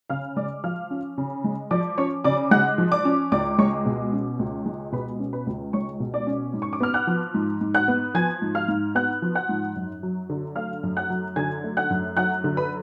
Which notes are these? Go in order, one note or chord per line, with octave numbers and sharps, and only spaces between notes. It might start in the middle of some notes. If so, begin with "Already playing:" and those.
C#3 F5 F6
G#3 D5 D6
F3 F5 F6
C#4
C#3
G#3
F3 D5 D6
C#4 C#5 C#6
C#3 D5 D6
G#3 F#5 F#6
F3
D5 D6
C#4
C#2 D5 D6
G#3 C#5 C#6
B2
C#4
C#2
G#3
B2 B4 B5
C#4
B4 B5
C#2
G#3 C#5 C#6
B2
D5 D6
C#4
G#2
C#6
D6
B3 F6
F#5 F#6
F3
G#2
G#2
F#5 F#6
B3
F3 G#5 G#6
G#2
F5 F6
G#2
B3 F#5 F#6
F3
F#5 F#6
G#2
F#2
F#3
D3
A3 F5 F6
F#2
F#5 F#6
F#3
D3 G#5 G#6
A3
F#5 F#6
F#2
F#3 F#5 F#6
D3
B4 B5